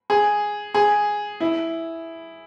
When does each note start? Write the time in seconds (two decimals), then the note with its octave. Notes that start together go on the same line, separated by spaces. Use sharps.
0.10 G#4
0.74 G#4
1.40 E4